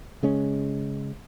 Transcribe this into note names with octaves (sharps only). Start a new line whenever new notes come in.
C#3 G#3 C#4